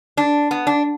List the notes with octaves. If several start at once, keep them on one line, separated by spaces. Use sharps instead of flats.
D4
B3
D4